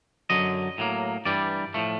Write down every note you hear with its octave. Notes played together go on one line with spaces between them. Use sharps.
F#2 D3 F#3 D#5
A2 F#3 A#3
G2 E3 G3 D5
A2 F3 A3